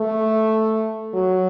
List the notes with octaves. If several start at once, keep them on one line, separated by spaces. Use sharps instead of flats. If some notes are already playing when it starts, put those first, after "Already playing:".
Already playing: A3
F#3